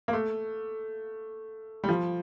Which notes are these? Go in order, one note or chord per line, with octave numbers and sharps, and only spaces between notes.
A#3
A3
G3
F3